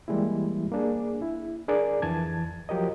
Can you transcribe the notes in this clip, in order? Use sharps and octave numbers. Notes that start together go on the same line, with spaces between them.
E3 G3 G#3 A#3 E4
A#3 D4 G#4
E4
D4 G#4 A#4 D5
F2 E3 A5 G#6
F3 F#3 G4 A#4 D#5